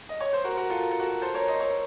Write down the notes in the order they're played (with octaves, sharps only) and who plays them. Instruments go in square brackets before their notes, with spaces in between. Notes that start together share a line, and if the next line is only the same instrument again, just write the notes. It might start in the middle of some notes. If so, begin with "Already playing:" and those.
[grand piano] D#5
C#5
C5
F#4 A#4
F#4 A#4
F4 A4
A#4
A4
F#4 A#4
A4 C5
A#4 C#5
C5 D#5
A#4 C#5